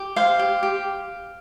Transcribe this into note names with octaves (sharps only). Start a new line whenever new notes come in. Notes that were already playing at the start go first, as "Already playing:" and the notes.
Already playing: G4
C5 F5
G4
G4